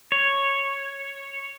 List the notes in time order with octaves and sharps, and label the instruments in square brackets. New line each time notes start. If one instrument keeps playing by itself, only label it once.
[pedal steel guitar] C#5